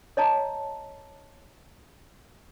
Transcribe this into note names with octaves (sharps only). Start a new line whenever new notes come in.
C#5 D#5 A5 A#5